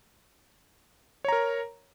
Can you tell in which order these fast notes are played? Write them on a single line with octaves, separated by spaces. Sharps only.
C#5 A#5 A#4